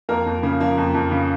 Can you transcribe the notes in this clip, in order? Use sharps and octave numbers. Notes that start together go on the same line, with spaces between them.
F2 A#3 A#4
F2
C#3 A#3
F3 A#3
F2
F2
C#3